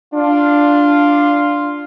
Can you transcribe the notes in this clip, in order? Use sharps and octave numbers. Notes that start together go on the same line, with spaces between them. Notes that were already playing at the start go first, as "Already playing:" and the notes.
D4 F4